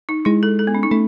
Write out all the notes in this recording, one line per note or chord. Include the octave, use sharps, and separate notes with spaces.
D#4
G#3 E4
A4
A4
B3
C#4
D#4
A3 C#4